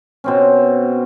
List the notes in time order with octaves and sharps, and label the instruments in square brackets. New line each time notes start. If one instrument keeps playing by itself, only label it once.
[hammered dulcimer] B2 C4 C#4